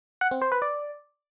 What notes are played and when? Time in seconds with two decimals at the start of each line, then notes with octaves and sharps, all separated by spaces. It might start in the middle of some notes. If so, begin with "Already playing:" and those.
0.21 F#5
0.31 C4
0.42 C5
0.52 B4
0.62 D5